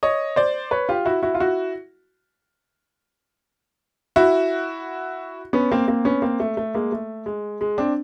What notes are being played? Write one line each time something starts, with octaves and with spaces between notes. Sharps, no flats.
C#5 D#5
C5 D5
B4 C#5
F4 G4
E4 F#4
E4 F#4
F4
E4 F#4
E4 F#4
B3 C#4
A#3 C4
A#3 C4
B3 C#4
A#3 C4
A3
A3
G#3 A#3
A3
G#3
G#3
C4 D4